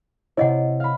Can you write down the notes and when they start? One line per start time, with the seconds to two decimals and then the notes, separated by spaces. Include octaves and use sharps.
0.37 C3 E4 C#5 D#5 F#5
0.80 F5 B5